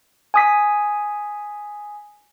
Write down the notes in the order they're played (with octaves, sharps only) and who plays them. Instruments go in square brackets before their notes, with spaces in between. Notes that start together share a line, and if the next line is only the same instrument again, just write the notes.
[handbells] G#5 D#6 B6